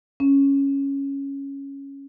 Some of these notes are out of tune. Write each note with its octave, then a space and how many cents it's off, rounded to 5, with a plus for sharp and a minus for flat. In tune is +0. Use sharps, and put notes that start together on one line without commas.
C#4 -5